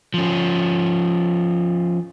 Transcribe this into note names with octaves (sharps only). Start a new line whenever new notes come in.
F3 C#4